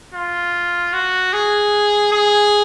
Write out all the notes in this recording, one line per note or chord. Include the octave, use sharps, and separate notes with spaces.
F4
F#4
G#4
G#4